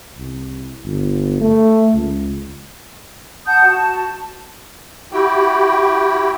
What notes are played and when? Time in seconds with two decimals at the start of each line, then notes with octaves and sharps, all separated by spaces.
0.18 C2
0.84 G1
1.41 A3
1.93 C#2
3.46 F#5 A5 D#6 G6
3.65 F#4 A5
5.12 E4 F#4 G4 G5